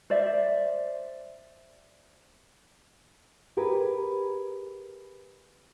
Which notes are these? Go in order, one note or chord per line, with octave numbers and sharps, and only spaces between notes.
C5 D5 E5
G4 G#4 A#4 B4